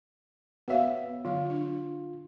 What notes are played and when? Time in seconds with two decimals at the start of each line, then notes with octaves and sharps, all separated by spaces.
0.68 B3 F#4 C#5 E5 F5
1.25 D3 F#3 F4
1.50 D4